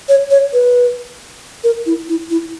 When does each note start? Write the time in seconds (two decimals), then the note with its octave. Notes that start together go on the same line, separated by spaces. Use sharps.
0.08 C#5
0.30 C#5
0.53 B4
1.64 A#4
1.86 E4
2.09 E4
2.30 E4